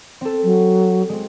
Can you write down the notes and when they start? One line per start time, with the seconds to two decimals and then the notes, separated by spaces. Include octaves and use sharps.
0.21 C4 A4
0.44 F#3
1.09 G#3 C4